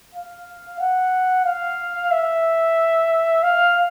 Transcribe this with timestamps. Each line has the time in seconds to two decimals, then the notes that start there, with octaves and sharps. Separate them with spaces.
0.15 F5
0.80 F#5
1.45 F5
2.12 E5
3.43 F5